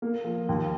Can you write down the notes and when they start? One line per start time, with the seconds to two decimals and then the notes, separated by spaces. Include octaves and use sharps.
0.02 A#3
0.24 F3
0.49 D#2